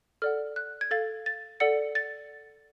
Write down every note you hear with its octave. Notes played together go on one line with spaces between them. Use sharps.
A4 D5 F#5 F6
F#6
G#6
A4 F5 A6
A6
A4 D5 F#5 C#7
A6